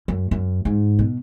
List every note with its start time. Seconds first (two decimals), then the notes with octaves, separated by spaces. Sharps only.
0.08 F#2
0.31 F#2
0.65 G#2
0.99 B2